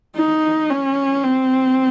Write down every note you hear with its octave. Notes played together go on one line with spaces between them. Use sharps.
D#4
C#4
C4